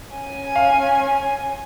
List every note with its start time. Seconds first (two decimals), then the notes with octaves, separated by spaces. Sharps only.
0.14 C#4 G#5
0.56 F5